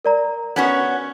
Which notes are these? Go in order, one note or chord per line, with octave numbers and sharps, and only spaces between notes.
A#4 D5 A#5
B3 C#4 F#4